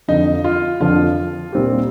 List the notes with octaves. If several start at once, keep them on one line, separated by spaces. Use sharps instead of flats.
F2 D3 F3 D#4
F4
F2 D3 F3 F4
A#2 G3 C4 D#4 G4